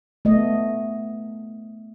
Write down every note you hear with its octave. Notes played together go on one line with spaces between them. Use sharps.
A3 B3 D#5